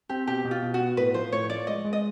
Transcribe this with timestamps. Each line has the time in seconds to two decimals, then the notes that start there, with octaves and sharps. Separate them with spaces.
0.09 C4 G4
0.27 B2 G4
0.45 B2
0.51 F4
0.63 B2
0.74 F#4
0.80 B3
0.97 A2 B4
1.14 F3 C5
1.32 A2 C#5
1.50 F3 D5
1.67 G#3 D#5
1.85 G#3
1.93 D#5